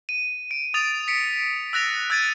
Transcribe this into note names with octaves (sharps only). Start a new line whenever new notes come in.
D#7
D7
D#6 A6 F7
B6 C#7 D7
E6 F#6 A#6 F7
E6 F#6 G#6 A6 D7 D#7